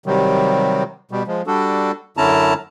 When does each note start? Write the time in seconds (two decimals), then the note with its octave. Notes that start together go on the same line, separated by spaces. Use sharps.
0.06 C3 D#3 F#3 G3
1.11 B2 G3
1.27 F3 G#3
1.47 G3 D4 F#4 A4
2.17 F#2 D3 C#4 E4 A5 A#5